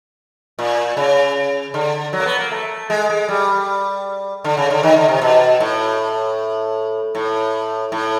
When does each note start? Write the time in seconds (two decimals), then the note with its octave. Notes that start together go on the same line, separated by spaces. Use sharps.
0.59 A#2
0.97 C#3
1.74 D3
2.13 F#3
2.20 A#3
2.26 B3
2.39 A#3
2.51 A3
2.90 G#3
3.10 G#3
3.29 G3
4.44 D3
4.57 C#3
4.70 D3
4.83 D#3
4.96 D3
5.08 C3
5.21 B2
5.60 A2
7.15 A2
7.92 A2